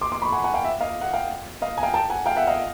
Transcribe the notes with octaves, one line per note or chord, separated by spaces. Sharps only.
C6 D6
C6 D6
B5 C#6
F#5 G#5
F#5 G#5
F5 G5
E5
D#5 F5
F#5
F5 G5
D#5 F5
G#5
F5 G5
G5 A5
F#5 G#5
F5 G5
E5 F#5
D#5 F5